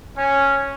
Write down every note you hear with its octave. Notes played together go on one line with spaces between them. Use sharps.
C#4